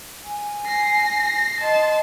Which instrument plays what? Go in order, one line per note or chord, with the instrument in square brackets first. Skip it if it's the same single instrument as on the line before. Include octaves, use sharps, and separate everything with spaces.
[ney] G#5
[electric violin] A#6 C7
[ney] D#5 [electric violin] A5 C6